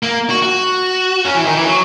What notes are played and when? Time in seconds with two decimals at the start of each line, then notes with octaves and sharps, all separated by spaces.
0.03 A#3
0.30 F#4
0.42 F#4
1.25 C#4
1.35 E3
1.45 D#3
1.56 E3
1.65 F#3